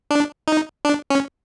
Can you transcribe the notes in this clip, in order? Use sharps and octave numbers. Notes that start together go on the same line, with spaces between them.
D4
D#4
D4
C#4